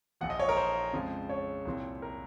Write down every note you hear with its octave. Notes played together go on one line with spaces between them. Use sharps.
A#1 A#2 F3 F#5
D#5
C#5
A#4
C5
F2 C#3 F3 G#3
C#5
C2 A#2 F3 C4
A#4